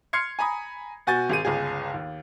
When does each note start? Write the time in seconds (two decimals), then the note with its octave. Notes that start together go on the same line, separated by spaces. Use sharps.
0.13 C6 F6 G#6 C7 C#7
0.39 G#5 A#5 B5 D#6
1.07 B2 F#4 G#5 G6 A6
1.29 G#1 G#4 D#7
1.45 G1 C#2 G#4
1.94 D#2